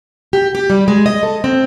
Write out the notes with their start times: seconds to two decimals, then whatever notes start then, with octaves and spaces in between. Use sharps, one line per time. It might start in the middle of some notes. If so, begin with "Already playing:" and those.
0.33 G4
0.55 G4
0.70 G3
0.88 G#3
1.06 D#5
1.23 A4
1.44 C4